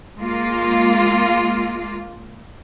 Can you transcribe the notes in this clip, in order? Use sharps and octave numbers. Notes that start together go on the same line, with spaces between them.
G#3 A#3 F4